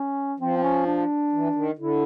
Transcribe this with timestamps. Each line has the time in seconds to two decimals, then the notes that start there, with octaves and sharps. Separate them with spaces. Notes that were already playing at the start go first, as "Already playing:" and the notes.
Already playing: C#4
0.40 F3 C4
0.57 C4
0.63 C#4
0.86 D4
1.32 E3
1.55 D#3
1.79 D3 E4